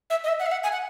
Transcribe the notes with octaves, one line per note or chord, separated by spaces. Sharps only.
E5
D#5
E5
F#5
E5
F#5
G#5
F#5